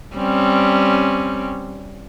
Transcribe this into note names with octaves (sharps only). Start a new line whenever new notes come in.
G3 C4 C#4